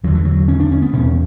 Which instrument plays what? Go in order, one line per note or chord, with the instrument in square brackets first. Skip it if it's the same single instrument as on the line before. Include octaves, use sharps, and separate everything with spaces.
[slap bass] E2 D3 F#3
E3
F#3
C#4
D4
C#4
B3
E2 B2 C#4